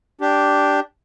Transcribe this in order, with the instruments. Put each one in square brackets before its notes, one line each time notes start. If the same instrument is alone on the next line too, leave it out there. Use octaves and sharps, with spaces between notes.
[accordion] D4 G4